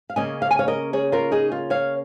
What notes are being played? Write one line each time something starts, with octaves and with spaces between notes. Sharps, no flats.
F5
C#3 A#3 C#4 D#5 G#5
F5
G#5
C#5 F5
A#4 D#5
G#4 C#5
F4 A#4
D#4 G#4
F4
C#5 F5